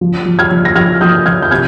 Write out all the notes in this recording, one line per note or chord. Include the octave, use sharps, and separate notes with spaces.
F3
F3
F6 G#6
F3
A#6
F3 F6 G#6
F3 D#6 G6
F3 F6 G#6
G6
C3 F6 G#6